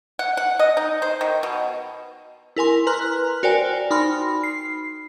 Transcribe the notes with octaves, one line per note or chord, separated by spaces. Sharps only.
F#5
F#5
D#5
D#4
C5
D#3
B2
E4 A#4 G#5 C6
B4 A#5 C6 F6 F#6
F#4 A#4 C5 D5 G5 G#5
D#4 B5 C6 F6
C7